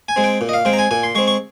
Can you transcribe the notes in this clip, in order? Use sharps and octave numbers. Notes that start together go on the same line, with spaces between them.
G#5
G#3 C4
G5
A#2
D#5
F5
G#3 C4 G5
A#5
G#5
A#2 G#5
C6
G#3 C4 C#6
C#6